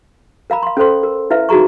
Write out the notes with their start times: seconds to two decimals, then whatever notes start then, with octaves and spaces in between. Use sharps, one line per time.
0.50 A#4 F5 A#5 B5
0.63 F5 C6
0.77 C#4 A4 C5 C6
1.03 A#4
1.31 E4 B4 E5 F5
1.49 D#4 F#4 G#4 A#5 C#6